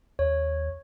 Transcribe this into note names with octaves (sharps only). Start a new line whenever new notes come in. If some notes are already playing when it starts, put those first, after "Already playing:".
D#2 C#5